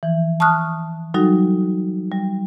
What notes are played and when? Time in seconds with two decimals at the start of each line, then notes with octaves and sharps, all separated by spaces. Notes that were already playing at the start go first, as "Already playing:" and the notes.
0.03 E3 F3
0.40 A5 C#6 D#6 F6 F#6
1.14 F#3 G3 D#4 F#4 A4
2.12 G3